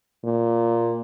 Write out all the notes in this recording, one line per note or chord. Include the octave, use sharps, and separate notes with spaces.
A#2